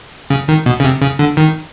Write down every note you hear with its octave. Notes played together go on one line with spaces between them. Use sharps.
C#3
D#3
B2
C#3
C3
C#3
D3
D#3